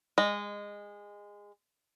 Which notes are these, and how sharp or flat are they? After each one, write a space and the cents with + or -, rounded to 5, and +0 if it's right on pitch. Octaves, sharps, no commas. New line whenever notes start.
G#3 -20 D#5 -10